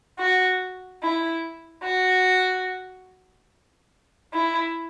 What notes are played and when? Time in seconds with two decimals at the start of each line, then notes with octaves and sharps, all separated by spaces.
0.19 F#4
1.01 E4
1.84 F#4
4.32 E4